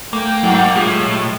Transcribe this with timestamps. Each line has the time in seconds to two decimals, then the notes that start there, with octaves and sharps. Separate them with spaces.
0.13 A3 A#3 G5
0.43 G2 F#3
0.75 A2 G#3 F4 G4